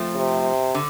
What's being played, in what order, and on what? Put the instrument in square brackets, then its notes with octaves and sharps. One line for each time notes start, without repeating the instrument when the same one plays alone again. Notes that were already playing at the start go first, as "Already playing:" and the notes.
Already playing: [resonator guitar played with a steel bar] F3 A3 C4
[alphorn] C3
[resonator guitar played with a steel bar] D3